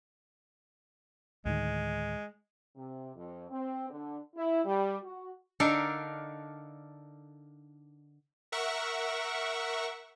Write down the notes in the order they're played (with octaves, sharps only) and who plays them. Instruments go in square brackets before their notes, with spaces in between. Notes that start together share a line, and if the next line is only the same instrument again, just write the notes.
[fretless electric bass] D2 A2 D#3 [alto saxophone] G#3
[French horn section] C3
F2
C4
D3
E4
G3
F#4
[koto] D3 D4 D#4 A4 A#4 F5
[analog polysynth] A#4 E5 F#5 C#6